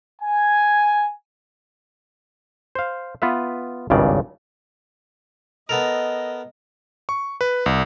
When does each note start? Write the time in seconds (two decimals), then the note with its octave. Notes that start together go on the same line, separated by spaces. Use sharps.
0.20 G#5
2.75 C5 F5
3.22 B3 F4 B4 E5
3.90 G#1 C#2 G2 C#3 D5
5.69 B3 A4 A#4 D#5
7.09 C#6
7.41 B4
7.66 C2